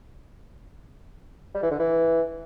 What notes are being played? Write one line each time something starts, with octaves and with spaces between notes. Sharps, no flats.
G3
E3
D3
E3